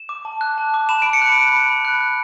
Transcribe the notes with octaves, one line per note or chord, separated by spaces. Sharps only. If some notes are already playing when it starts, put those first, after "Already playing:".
Already playing: E7
D6
A5
F#6
A5
D6
B5 E7
B5 D7
C#7
F#6 D7
F#6
B5
B5
F#6
F#6